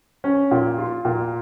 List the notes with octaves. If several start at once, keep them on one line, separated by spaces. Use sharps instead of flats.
C#4
A#2
F4
A#2